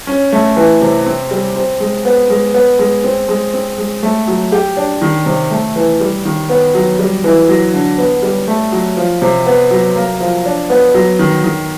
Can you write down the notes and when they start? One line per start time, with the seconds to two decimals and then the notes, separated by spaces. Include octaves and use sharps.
0.07 C#4
0.32 A3
0.57 E3
0.81 C3
1.06 C4
1.31 G3
1.56 C4
1.80 G#3
2.05 B3
2.30 G#3
2.54 B3
2.79 G#3
3.04 C4
3.28 G#3
3.54 C4
3.78 G#3
4.03 A3
4.28 F#3
4.52 G4
4.77 D4
5.02 D#3
5.26 C3
5.51 A3
5.76 E3
6.00 G3
6.25 D#3
6.49 B3
6.75 F#3
6.99 G3
7.24 E3
7.49 F#3
7.74 D3
7.98 B3
8.23 G3
8.48 A3
8.72 F#3
8.97 F3
9.22 C3
9.46 B3
9.71 F#3
9.96 A#3
10.20 F3
10.45 D4
10.70 B3
10.94 F#3
11.19 D#3
11.44 D#3